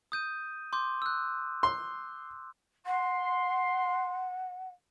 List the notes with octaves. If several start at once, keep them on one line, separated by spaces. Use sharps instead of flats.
D#6 G6 D#7
C6 D6 G6
E6 F#6
C6
F#5 C6